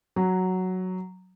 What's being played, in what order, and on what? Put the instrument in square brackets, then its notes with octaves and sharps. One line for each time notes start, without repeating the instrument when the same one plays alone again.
[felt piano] F#3